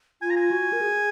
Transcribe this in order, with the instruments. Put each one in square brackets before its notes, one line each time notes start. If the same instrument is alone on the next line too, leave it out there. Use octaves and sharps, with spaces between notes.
[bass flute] F4 [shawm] G#5
[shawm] A#5
G#5
[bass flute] F#4
A#4
G#4